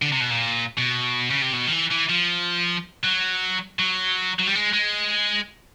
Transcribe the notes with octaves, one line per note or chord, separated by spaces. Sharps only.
D3
C3
B2
A#2
B2
C#3
C3
B2
D#3
E3
E3
F3
F#3
F#3
F#3
G3
G#3
G#3